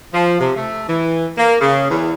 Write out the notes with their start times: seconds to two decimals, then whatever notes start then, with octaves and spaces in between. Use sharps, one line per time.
0.14 F3
0.40 C3
0.56 A3
0.88 E3
1.38 A#3
1.60 C#3
1.90 E2